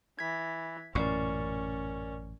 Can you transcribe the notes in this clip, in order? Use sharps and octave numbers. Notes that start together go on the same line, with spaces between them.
E3 G#6 B6
A1 F#2 A#2 C#4 A#4 D5 C#6